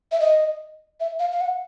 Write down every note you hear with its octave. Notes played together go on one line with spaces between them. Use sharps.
E5
D#5
E5
F5
F5
F#5